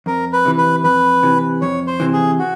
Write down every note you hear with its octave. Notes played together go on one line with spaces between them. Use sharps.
F2 A#4
B4
C3 E3
B4
F2 B4
C3 E3
F2 C#5
C5
C3 E3
G#4
F#4